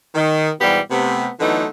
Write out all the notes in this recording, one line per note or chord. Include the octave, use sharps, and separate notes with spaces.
D#3
G#2 B2 E3 G3 B3 G4
C3 A3 B3
D3 E3 F#3 A3 B3 D#4